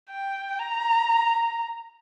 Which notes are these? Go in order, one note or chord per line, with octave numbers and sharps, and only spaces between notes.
G5
A#5